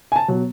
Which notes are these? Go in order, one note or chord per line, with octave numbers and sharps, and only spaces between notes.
G#5
A5
B2 F#3